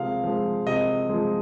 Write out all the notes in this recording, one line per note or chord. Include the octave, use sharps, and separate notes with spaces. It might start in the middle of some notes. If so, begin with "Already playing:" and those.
Already playing: C3 F3 G#3 F5
F3 G#3
C3 D#5
F3 G#3